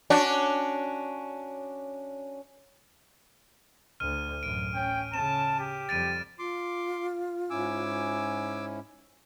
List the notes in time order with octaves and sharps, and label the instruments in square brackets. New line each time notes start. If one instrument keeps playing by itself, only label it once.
[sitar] C#4 D4 F#4
[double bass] D2 [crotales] F6 D#7
[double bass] A1 F#2 [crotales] D7
[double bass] C#4 [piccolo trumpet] G5
[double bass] C#3 C#4 [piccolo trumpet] A5 [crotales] E7
[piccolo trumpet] G4
[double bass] F2 G3 [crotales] A6 D7 D#7
[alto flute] F4 [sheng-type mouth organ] C6 D6
[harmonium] G#2 C#4 E4 [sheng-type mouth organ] G#5 D6 E6